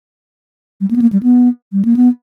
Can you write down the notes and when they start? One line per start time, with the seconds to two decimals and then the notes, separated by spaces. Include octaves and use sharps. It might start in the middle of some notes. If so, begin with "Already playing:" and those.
0.81 G3
0.91 A#3
0.96 B3
1.02 A#3
1.12 G3
1.23 B3
1.73 G3
1.85 A#3
1.96 B3